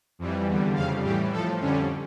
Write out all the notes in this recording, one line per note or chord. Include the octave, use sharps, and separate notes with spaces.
F2 E3 G3
E2 D3 G3
F2 C#3 G3 F5
A2 E3 G3 G4
A2 F3 A4
F2 D3 G3 C#4